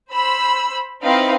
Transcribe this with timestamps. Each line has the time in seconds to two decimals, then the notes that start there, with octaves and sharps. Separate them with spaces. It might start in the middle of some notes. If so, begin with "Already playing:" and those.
0.12 C5 B5 E6
1.03 C4 D#4 E4 B4 F5